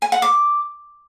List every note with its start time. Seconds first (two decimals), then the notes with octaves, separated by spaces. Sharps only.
0.02 G#5
0.12 F#5
0.22 D6